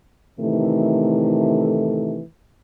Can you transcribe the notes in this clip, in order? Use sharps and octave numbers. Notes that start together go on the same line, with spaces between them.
A2 C3 D#3 E3 A3